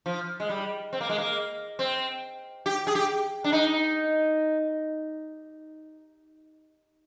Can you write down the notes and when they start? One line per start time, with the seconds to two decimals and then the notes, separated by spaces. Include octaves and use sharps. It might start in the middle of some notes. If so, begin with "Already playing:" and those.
0.06 F3
0.40 G#3
0.49 G3
0.93 C4
1.01 A#3
1.09 G#3
1.18 A#3
1.79 C4
2.66 G4
2.87 G#4
2.95 G4
3.44 D4
3.52 D#4